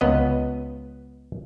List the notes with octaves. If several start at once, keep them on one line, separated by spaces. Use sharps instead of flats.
C#2 B3 D#5